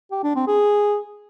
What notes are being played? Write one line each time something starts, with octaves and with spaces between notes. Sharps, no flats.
G4
D4
C4
G#4